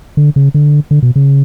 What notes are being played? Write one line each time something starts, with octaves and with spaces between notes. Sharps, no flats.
D3
C#3
D3
D3
B2
C#3